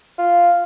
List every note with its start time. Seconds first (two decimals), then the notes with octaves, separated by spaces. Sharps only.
0.18 F4